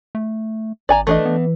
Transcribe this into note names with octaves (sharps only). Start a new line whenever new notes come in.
A3
G#1 D5 G#5 A#5
E3 A3 D4 D#5
B3